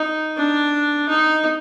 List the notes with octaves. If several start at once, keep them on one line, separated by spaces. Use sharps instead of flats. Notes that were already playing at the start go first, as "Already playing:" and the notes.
Already playing: D#4
D4
D#4